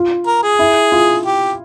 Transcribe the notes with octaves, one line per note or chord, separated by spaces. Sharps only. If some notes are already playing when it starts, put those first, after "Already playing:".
Already playing: F4
A#4
G#4
E4
F4
G4